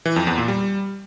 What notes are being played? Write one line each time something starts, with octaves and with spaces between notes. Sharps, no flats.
E3
F2
E2
A#2
G3